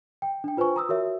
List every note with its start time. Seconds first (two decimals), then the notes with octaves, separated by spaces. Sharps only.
0.22 G5
0.44 D4 G5
0.57 F4 B4 C5 G#5 C#6
0.76 A#5 D#6 E6
0.89 F#4 A#4 C#5 E5